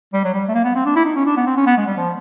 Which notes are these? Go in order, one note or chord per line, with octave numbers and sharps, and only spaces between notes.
G3
F#3
G3
A3
A#3
B3
C4
D4
E4
D#4
C#4
D4
B3
C4
C#4
B3
G#3
G3
F3